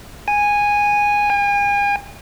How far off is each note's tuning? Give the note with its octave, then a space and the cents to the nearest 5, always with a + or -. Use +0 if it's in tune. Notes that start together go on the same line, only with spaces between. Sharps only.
G#5 -10
G#5 -40